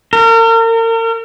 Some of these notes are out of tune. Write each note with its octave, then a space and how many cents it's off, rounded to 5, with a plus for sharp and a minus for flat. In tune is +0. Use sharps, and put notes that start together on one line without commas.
A#4 -40